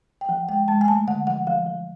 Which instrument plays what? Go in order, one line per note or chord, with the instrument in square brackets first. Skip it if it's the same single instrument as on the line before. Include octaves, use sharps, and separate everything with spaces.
[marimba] G5
F3 F#5
G#3 G5
G#3 A5
G#5
A3 A5
D3 F#5
F3 F#5
F3 F5
F3